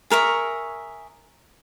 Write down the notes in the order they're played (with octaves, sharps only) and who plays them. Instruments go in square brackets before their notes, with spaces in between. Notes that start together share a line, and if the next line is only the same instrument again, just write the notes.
[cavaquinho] G#4 A#4 E5 C#6